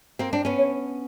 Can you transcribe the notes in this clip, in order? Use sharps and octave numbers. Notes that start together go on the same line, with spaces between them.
A#3 C4
C4 D4
B3 C#4
C#5